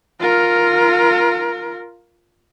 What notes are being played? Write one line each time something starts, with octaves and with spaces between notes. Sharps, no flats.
F4 A#4